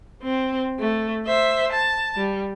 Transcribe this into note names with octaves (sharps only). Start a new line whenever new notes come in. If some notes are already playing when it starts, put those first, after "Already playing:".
C4
A3
C5 E5
A5
G3